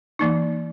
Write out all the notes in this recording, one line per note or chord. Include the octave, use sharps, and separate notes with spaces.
E3 A#3 D#4